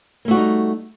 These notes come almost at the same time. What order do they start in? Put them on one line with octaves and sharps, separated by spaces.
A#3 A3 F#4 G3 D#4